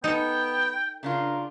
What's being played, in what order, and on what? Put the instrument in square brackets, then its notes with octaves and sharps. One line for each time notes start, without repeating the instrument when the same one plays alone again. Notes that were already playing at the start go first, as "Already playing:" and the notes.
[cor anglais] B3 [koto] D#4 A4 [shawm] G5
[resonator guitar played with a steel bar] C#3 D4 F4 [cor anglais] A#4